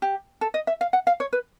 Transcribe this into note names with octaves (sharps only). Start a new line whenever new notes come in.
G4
A4
D#5
E5
F5
F#5
F5
C#5
B4